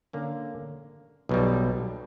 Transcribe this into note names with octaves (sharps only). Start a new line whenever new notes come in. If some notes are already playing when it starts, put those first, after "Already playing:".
D3 A#3 C#4
B1 B2 G3